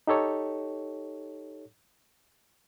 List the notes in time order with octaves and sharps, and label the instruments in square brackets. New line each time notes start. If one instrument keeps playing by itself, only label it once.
[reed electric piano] D#4 G4 A4 C#5